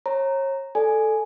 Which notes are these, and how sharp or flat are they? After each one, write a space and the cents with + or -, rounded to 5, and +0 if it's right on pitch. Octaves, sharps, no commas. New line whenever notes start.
C#5 -35 A#5 -5
A4 +0 D5 +5 G#5 +10